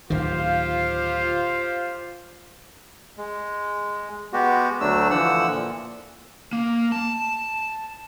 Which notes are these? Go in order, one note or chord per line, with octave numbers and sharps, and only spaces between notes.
D1 D#3 F4 G4 C5 F5
G#3
G#3 B3 F#4 G4
D2 F#3 A3 D4 E6
D3 E3 F3 F#5 E6
A#2
A#3
A5